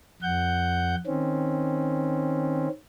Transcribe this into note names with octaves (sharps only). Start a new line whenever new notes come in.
F2 F#5 G6
D#3 C4 C#4